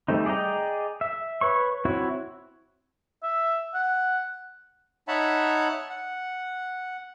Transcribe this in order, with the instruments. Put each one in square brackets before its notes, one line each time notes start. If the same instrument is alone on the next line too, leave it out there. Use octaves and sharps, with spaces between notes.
[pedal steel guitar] G3 A3 C4 D#4
G#4 D5 D#5 G5 A#5
E5
B4 C#5 C#6
C4 E4 F#4 C#5
[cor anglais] E5
F#5
[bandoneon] D#4 C#5 E5 F#5 A5 B5
F#5